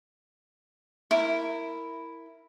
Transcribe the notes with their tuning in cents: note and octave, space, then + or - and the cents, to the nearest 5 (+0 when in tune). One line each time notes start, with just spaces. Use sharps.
E4 +0 A#4 -10